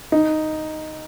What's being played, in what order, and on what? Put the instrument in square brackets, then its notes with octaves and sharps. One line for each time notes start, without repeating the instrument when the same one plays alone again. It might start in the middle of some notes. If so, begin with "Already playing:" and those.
[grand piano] D#4